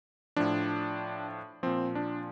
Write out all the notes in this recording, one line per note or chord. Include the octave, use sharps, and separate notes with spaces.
A2 F3 D4
A#2 F3 C4
D4